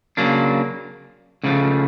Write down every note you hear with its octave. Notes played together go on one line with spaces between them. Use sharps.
C#3 F#3 A#3 D4
C#2 C#3 F3 A3